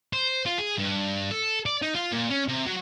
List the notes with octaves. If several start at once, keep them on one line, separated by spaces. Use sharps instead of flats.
C5
F4
G#4
G2
A4
D5
D#4
F4
A#2
C#4
C3
F#3